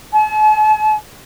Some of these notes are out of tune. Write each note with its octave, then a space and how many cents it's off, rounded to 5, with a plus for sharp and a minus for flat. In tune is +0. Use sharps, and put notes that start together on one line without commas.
A5 -45